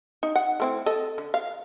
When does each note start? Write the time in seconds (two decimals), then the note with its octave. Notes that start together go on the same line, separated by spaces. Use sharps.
0.23 D#4
0.35 F#5
0.60 A3 C4 E4
0.86 A4 D#5
1.18 D3
1.34 F5